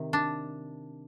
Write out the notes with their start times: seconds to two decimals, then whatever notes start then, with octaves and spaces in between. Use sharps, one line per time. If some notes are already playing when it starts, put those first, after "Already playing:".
Already playing: C3 D#3
0.13 D4